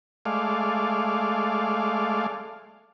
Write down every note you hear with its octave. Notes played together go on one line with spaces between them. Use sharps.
G#3 A3 D5 F5